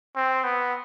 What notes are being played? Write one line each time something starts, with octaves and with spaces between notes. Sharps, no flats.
C4
B3